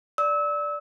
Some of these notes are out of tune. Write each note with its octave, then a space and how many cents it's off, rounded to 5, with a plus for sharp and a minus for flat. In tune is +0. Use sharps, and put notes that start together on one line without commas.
D5 +0 E6 -30